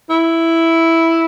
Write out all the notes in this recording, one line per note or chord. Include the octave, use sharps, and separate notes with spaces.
E4